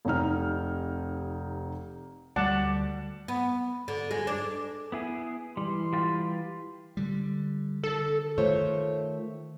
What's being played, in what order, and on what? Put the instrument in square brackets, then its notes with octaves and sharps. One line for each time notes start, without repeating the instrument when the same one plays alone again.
[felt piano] F1 C3 D#4 F6
[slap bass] D2 G3 [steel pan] D5 F#5 A5
[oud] B3
D3
G#3
D4
[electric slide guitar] B3 E4 G#4
[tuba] E3 [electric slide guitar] G3 [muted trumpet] C6
[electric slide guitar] G3 F4 G4
[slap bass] D3 G3
[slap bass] D3 [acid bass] A4
[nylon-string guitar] D#3 A3 F4 C5 C#5